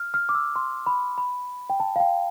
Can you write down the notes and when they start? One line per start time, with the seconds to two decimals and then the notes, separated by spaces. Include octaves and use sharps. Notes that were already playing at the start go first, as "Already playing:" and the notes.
Already playing: F6
0.14 F6
0.29 D6
0.35 E6
0.56 C6
0.87 B5
1.18 B5
1.70 G5
1.80 A5
1.96 F5
2.00 G5